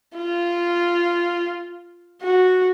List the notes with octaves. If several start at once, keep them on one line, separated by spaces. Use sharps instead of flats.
F4
F#4